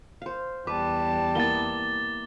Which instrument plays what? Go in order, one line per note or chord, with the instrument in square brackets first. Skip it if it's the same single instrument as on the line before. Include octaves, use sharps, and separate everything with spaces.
[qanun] C5 F5
[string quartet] E2 G3 A5 [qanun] B4 [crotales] D6
[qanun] A#3 B3 E4 [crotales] A6 G7